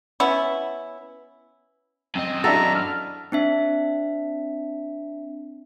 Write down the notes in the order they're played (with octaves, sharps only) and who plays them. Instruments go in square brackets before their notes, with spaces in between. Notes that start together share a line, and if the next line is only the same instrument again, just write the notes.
[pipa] B3 C#4 E4
[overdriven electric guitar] F#2 D#5 [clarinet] C4
[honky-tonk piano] D4 E4 F#4 [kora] A4 [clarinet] A#5
[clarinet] F6
[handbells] C4 D4 E5